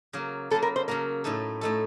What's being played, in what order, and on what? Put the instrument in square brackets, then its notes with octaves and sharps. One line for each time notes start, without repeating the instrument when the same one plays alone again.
[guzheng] C#3 F#3 A#3
[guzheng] C#3 F#3 A#3 [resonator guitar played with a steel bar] A4
[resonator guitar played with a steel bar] A#4
C5
[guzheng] C#3 F#3 A#3 [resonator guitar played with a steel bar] A#4
[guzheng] A2 A3 D#4 A4
A2 A3 D#4 A4